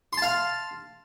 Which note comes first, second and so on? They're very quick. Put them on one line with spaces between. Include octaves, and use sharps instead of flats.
C6 A5 F5